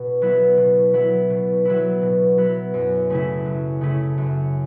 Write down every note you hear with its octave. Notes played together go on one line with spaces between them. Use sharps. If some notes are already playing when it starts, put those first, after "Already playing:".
Already playing: B2
F#3 B3 E4
B2
F#3 B3 E4
B2
F#3 B3 E4
B2
F#3 B3 E4
F#2
C#3 A3 C#4 E4
F#2
C#3 A3 C#4 E4
F#2